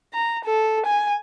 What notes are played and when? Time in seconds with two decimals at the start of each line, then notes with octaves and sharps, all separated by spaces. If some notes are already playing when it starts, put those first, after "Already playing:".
0.13 A#5
0.44 A4
0.86 G#5